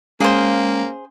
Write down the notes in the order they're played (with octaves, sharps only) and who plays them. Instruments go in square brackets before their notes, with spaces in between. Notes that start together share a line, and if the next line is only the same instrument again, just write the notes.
[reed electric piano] G#3 [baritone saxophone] A#3 [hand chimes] C#4 F5 [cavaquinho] G#4 C5